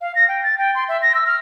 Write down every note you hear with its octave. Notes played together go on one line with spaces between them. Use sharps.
F5
A#6
G5
A6
G5
C6
E5
A#6
E6
F6